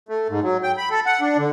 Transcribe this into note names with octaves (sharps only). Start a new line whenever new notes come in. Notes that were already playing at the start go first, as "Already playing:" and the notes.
A3
G#2
F#3
G5
B5
A4
F#5
D4
D3